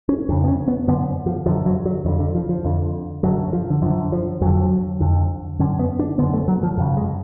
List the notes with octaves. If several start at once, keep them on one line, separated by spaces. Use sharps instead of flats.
C#4
F2 C#3 D4
B3
C#4
B3
F#2 D3 B3
F3
F#2 D3 F3
F#3
F#3
F2 D3 F3
D3
F3
F3
F2 D3
F#2 D3 F#3
F3
D3
F#2 D3 F3
F3
F2 D3 F#3
F2 D3
F#2 D3 C#4
B3
D4
F#2 D3 B3
A3
F#3
F3
F#2 C#3 F#3
G#3